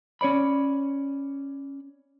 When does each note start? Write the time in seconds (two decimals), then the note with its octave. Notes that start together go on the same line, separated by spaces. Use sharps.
0.21 C#4 C#5 D5 B5